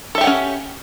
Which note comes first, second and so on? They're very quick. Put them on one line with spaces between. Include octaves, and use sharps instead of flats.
A4 E5 G4 F#5 C#4